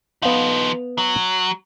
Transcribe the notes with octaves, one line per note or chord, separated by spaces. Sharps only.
F3 B3 D#4 F5
F#3